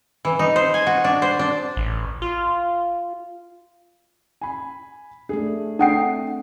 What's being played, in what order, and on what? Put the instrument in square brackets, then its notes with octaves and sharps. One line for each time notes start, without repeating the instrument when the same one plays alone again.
[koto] E3
D#4
C5
G#5
F#4
D4
C5
D4
[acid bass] A1
F4
[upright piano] G#5 B5
[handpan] A3 D4 [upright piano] G#4
[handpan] A3 C4 [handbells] D4 F#5 G5 [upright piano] D#6 C7